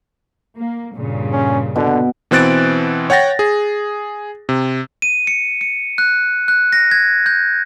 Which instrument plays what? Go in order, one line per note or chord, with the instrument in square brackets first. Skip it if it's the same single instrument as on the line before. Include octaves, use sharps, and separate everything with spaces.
[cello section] A#3
G2 A#2 C#3
[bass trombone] C#4
[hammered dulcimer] B2 [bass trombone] D3
[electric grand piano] B2 E3 C4 F#6 A6 D7
C#5 F#5 G5 A6 A#6
G#4
C3
[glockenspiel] D#7
C#7
C#7
F#6
F#6
A#6
G#6
G6